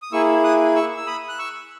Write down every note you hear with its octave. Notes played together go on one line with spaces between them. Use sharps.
D#6
A#3 E4 G#4 C#6 E6
D#6 F#6
C#6 E6
E6
B5 D#6
F#6
C#6 E6